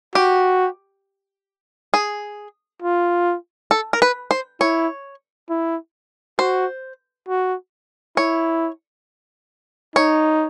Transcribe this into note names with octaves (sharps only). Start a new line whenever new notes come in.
F#4 G4
G#4
F4
A4
A#4
B4
C5
E4 C#5
E4
F#4 C5
F#4
E4 C#5
D#4 C#5